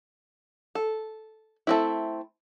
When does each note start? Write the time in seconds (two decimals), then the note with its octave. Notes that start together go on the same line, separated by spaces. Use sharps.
0.75 A4
1.67 A3 C4 E4